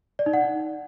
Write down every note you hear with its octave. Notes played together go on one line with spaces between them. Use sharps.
D5
D#4
F#5